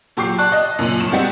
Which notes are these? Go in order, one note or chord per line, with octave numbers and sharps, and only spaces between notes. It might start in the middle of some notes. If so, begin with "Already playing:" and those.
A#2 F#3 G4 C#6 D6 C7
D5 A5 C#6 F#6
D#5
F#2 A#2 F#7
G2 E7
G3 G#3 B3 C4 F#4 G4